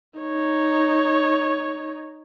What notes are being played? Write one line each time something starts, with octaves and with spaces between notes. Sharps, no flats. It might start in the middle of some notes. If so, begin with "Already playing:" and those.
D#4 C#5